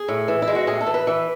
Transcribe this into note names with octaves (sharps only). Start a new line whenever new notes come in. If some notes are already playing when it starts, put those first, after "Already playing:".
Already playing: G#4
A2
E3
E4
G#3
F#4
A2 G#4
A4
E3
B4
E3